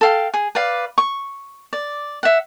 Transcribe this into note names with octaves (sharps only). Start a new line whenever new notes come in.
A4 F5 G5
G#4
B4 D5 F5
C#6
D5
E5 F#5